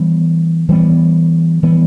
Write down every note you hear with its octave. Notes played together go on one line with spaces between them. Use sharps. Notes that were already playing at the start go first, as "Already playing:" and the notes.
Already playing: E3 G3 B3
E3 G3 B3
E3 G3 B3